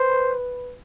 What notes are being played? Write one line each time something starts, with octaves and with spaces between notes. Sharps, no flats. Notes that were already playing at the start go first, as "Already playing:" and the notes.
Already playing: B4 C5